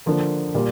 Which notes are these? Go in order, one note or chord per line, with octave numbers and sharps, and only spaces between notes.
D3 F3 A#3
A#2 G3